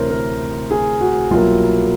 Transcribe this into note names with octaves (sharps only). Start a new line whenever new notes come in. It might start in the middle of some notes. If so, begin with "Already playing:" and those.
Already playing: D2 C3 E3 A#4 C5 C#5
A#4
G#4
F#4
C2 B2 F#3 A#3 F4